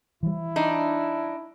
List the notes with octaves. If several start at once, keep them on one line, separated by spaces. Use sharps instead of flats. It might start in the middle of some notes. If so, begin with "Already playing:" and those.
E3 G3 E4
D4 D#4